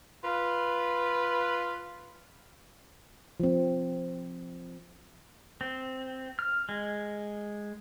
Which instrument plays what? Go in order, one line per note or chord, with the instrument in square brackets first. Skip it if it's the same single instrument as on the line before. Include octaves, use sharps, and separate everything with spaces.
[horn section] F4 B4
[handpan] F3 C4
[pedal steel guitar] C4
F6
G#3